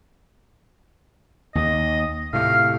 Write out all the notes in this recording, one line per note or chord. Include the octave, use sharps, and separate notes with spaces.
D#2 D#5
A2 C3 F5